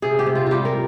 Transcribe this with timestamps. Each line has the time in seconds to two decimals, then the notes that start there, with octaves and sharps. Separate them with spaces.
0.02 C3 G#4
0.19 G4
0.26 C3
0.35 F4
0.46 G3 F4 G4
0.65 A#4